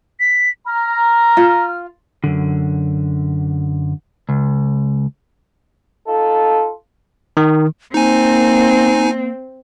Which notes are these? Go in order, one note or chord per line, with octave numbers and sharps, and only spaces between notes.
B6
A#5 F6
F4
F#2 D3
C#2
D#4 F4 A4
D#3
A#3 C4 D#4 G#5